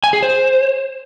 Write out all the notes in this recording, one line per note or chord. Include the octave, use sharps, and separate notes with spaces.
G#5
G#4
C5